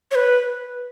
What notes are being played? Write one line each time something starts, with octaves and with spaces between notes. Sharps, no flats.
C#5
B4